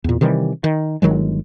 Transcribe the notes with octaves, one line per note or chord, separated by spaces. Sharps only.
E2 A#2
C3 D#3 E3 G3
D#3
G1 D#3 F#3 G#3